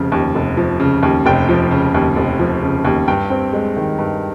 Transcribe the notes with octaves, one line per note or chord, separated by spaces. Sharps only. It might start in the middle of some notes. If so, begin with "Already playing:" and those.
Already playing: F1 C#3 F3
D#2
F1
F3
C#3
D#2
F1 G5
F3
C#3
D#2
F1
F3
C#3
D#2
G2 G5
C4
G#3
D#3
G2